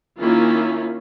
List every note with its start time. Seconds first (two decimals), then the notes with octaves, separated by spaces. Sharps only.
0.19 D#3 A#3 C#4 E4 F4